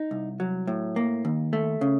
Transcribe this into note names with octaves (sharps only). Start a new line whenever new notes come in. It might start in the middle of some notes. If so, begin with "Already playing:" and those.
Already playing: D#4
C2
F#3
A2
A#3
D#2
A3
C#3